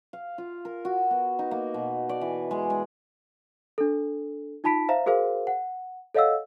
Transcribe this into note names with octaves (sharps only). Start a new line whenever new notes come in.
F5
F4
A#4
F#4
B3
D#4
A#3
B2
D5
E3
G#3
G#3
D4 A4
D#4 F4 A5 B5 B6 D7
C5 E5 F5 A#5
F#4 G#4 A#4 C5 F5
F#5
A4 C#5 D#5 F5 F#5 E6